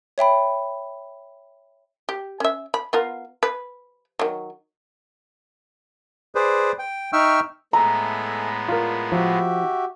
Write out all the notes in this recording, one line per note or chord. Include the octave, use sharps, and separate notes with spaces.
C#5 E5 G5 B5
G4
C#4 E5
B5
B3 F4 A#4
B4
D#3 F#3
G#4 B4 C5 D5
G5
D#4 E5 G5 C#6 E6 F6
A2 G#3 B3 A4 E5 G#5 A#5
F4 A#4 D5
F3 F#4 G4 E5